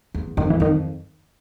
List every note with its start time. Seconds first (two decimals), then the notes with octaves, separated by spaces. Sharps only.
0.14 E2
0.37 F2 D#3
0.50 E3
0.60 F2 D#3